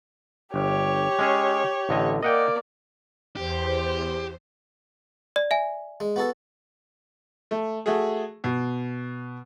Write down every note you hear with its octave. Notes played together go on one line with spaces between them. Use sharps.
G1 G4 C#5
G#3 C#4 G#4
A1 D3 D#5
A#3 D5 D#5 F#5 G5
E2 G4 C5
D5
E5 G#5
G#3
B3 F#4 A4
A3
A3 F#4 G#4
B2